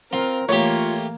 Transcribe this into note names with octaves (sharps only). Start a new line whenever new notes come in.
C4 F4 A#4
E3 A3 A#3 F4 G4 C#5